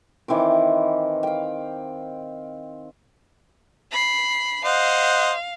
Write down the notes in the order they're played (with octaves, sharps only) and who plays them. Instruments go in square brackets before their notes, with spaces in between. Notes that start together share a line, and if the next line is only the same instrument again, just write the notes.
[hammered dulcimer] D#3 E3 C4 D6
F5 G5
[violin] B5 C7
[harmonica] C5 D#5 F#5 [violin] F5